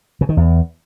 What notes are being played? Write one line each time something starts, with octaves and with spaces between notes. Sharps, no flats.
C#3
D#3
E2